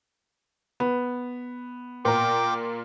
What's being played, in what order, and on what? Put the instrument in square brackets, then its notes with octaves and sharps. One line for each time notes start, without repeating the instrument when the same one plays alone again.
[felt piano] B3
[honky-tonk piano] A#2 A#4 [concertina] G5 D6